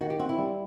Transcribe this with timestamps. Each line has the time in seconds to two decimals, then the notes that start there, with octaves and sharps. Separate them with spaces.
0.01 D#3 F#4
0.10 G4
0.19 C4 F#4
0.29 E4
0.39 G3